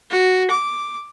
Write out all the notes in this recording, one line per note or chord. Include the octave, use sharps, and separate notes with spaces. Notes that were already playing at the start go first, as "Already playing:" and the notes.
F#4
D6